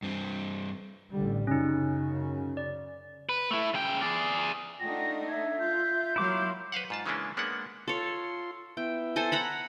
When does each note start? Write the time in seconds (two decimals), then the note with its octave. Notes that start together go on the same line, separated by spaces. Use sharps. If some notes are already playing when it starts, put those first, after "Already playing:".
0.03 G2 C4
1.11 A1 D3 G3
1.47 F#2 C#3 C#4 D#4
2.57 D5
3.29 B4
3.51 A3 E4
3.74 C#3 G5
4.02 G#4 D5
4.80 A3 D4 D#4 F4 F#5 G5 A#6
5.28 E5 G#6
5.59 F4 G6
6.16 F#3 A#3 E4 F5 C6 D6
6.72 B4 C5 F5 F#5
6.90 G#2 F4 A5
7.06 C#3 E3 G#3 A#3 C#4 D4
7.37 G#3 A#3 B3 C#4 D4 F#5
7.88 F4 A4 C#5 C6
8.77 B3 E4 E5 G5
9.16 A4 C5 G#5
9.32 F#5 A#5 B5